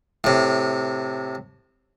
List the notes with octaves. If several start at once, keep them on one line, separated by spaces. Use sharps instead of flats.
A2 C3